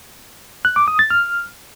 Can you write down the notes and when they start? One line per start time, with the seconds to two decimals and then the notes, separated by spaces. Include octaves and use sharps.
0.65 F#6
0.76 D6
0.88 D#6
0.99 A6
1.10 F6